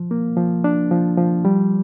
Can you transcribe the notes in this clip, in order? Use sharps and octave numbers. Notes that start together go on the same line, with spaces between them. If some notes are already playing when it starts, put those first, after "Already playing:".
Already playing: F3
A#3
F3
D4
F3
F3
G3